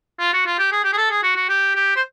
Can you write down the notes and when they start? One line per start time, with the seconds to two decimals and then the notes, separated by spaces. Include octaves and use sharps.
0.19 F4
0.33 F#4
0.46 F4
0.59 G4
0.72 G#4
0.84 G4
0.93 G#4
0.97 A4
1.10 G#4
1.23 F#4
1.36 F#4
1.49 G4
1.75 G4
1.96 C5